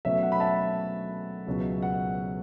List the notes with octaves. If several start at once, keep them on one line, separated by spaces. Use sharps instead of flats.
B2 F#3 A3 C#4 E5
F#5
B5
E5 A5
C#2 B2 F#3 C#4
F#5